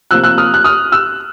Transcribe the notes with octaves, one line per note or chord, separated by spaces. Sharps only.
C3 F3 A#3 E6 F#6
E6 F#6
D#6 F6
F#6
D#6 F6
E6 F#6